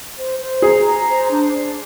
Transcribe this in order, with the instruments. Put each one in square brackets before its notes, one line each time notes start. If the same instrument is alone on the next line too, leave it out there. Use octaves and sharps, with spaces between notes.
[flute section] C5
C5
[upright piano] G#4 [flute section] A#5
[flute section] A#5
C5
D4
D4